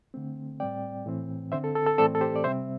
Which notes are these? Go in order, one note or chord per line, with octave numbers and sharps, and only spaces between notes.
D3 A3 C4
A2 G3 C4 D5 G5
A2 E3 C4
D3 C4 C5 E5
A4
A4
A4
A2 E3 A3 C4 A4 D5
A4
G4 C5
D5
C3 G3 C4 C5 E5